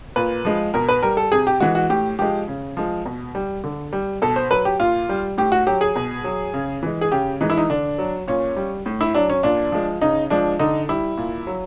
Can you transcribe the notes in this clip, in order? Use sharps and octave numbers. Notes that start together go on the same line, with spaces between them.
A#2 B4
F3 G#3
B2 A#4
B4
G3 A#4
A4
C3 G#4
G4
E3 G#3 F#4
F#4
A2 G4
F3 G#3 G4
C#3
F3 G#3
B2
G3
D3
G3
B2 A4
C5
F#3 B4
G4
A#2 F4
G3
A2 G4
F#4
F#3 G4
G#4
B2
F#3
C#3
E3 G#3
G#4
C#3 G4
E3 G#3 D#4
E4
D#4
D3 D4
F#3
A#2 C#4
G3
A2
E4
F#3 D4
C#4
A#2 D4
F3 G#3
C#3 D#4
F3 G#3 D4
D3 D#4
G3 E4
A#2
F#3